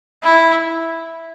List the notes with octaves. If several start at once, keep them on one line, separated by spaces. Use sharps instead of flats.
E4